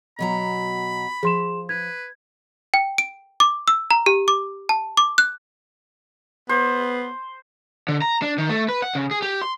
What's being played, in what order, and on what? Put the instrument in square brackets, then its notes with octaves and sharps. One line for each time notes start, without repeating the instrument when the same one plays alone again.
[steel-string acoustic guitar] B2 F#3 A#5 [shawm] B5
[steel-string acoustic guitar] F3 [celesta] G#4 C6 E7
[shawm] B4 [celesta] G#6
[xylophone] G5
D7
D6
E6
A#5
G4
D6
A5
D6
F#6
[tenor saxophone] B3 [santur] C5
[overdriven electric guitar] D3
A#5
D4
D#3
A3
B4
F#5
C#3
G#4
G4
C6